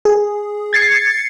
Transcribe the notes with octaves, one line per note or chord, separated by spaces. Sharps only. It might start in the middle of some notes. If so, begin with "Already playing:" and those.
G#4
G#6 A6 C7 C#7